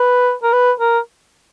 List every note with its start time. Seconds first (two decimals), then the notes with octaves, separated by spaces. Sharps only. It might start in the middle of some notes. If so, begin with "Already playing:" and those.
Already playing: B4
0.43 A#4
0.53 B4
0.80 A#4